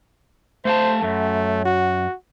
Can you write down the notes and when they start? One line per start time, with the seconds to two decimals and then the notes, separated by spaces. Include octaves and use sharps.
0.65 A3 C5 F5 A5
1.02 F#2 A3
1.65 F#4